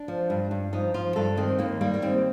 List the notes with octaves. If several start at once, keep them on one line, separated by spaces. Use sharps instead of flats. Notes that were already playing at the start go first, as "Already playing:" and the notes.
Already playing: D4
F3
G2
G2
F3 D#4
F3 F4
G2 A4
D#3 C4
D#2 A#3
G3 A#3
A#3
D#2 C4